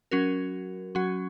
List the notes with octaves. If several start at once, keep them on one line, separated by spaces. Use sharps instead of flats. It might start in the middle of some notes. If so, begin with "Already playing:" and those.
F#3 C#4 F#4 A#4
F#3 C#4 F#4